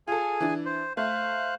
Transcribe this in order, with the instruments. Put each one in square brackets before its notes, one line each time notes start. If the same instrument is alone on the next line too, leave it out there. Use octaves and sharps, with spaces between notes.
[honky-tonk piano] F4 A4 [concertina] G#4 G#5
[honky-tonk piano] E3 D4
[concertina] C5
[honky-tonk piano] A3 [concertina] C5 F5 F#6